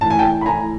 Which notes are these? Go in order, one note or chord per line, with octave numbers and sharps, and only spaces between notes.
A2 E3 A5
G#5
G5 A5
B5
A2 E3 G#5 A#5